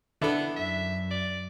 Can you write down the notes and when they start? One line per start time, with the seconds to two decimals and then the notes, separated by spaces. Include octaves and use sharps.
0.22 D3 B3 D4 E4 A4
0.56 F#2 E5
1.11 D5